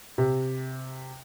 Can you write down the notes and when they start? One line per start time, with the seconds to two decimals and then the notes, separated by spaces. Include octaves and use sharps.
0.18 C3